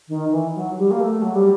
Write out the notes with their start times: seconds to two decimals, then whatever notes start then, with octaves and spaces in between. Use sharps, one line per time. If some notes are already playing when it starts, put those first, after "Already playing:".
0.09 D#3
0.31 E3
0.55 F#3
0.78 G3
0.91 A#3
1.01 A3
1.22 F#3
1.35 G3